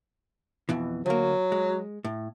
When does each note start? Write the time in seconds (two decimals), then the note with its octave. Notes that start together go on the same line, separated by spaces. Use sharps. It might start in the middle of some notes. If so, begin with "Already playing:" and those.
0.69 F2 B2 E3
1.06 D2 F#3 A#3
1.52 G#3
2.05 A2